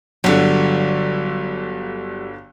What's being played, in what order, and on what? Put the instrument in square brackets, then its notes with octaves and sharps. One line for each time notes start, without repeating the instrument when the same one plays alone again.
[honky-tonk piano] G1 D3 [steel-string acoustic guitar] F#3 G3